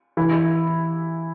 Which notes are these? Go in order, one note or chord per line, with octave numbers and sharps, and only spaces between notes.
E3 E4